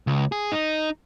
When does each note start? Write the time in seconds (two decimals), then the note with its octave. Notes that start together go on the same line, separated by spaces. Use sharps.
0.07 C#2
0.32 G#4
0.52 D#4